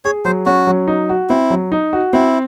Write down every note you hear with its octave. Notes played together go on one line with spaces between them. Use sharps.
G#4 C#5
F#3 C5
C#4 F#4
F#3
D#4
F#4
C4 E4
F#3
D#4
F#4
C4 E4